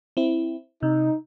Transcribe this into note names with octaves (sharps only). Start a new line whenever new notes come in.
C4 E4
C3 D#4